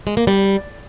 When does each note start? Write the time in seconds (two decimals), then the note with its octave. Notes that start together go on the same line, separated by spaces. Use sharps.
0.07 G#3
0.17 A#3
0.27 G3